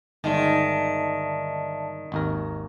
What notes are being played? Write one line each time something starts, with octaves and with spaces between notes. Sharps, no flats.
G1 D#3 G#3 D5 E5 A5
G#1 D#2 A#4